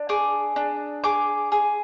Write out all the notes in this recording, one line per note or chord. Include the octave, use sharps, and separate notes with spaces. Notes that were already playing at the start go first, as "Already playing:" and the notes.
Already playing: D4
G#4 D6
D4
G#4 D6
G#4